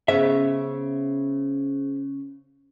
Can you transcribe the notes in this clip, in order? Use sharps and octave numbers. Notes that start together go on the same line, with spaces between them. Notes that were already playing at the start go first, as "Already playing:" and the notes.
C#3 B3 C#4 G#4 C5 E5